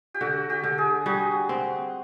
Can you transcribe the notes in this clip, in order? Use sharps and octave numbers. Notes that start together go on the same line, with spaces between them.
G4
D3 F#4
G4
D3
G#4
G3 F#4
C4